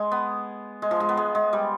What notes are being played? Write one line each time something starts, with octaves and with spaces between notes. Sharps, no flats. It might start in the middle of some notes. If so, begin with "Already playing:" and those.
Already playing: G#3
B3
G#3
F3
G#3
B3
G#3
G#3
G3